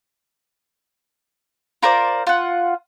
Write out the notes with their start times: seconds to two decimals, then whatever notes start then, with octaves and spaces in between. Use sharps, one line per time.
1.82 F4 A#4 C5 D5
2.27 F4 F#5